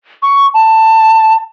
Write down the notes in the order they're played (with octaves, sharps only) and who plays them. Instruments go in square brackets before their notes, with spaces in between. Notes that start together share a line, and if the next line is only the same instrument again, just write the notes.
[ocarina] C#6
A5